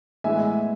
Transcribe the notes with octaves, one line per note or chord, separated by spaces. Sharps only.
A2 E3 G#3 B3 E5 G#5